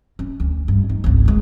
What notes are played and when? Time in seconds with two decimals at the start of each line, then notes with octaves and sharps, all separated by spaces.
0.19 C#4
0.40 D2
0.68 G2
0.89 D#4
1.04 G#1 C#2
1.25 D#3 G#3